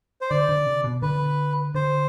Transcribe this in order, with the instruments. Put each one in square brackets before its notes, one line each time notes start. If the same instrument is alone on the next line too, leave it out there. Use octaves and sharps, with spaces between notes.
[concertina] C5
[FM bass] D3 [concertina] D5
[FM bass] D3
C3
B2
[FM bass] D3 [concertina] B4
[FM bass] D3 [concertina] C5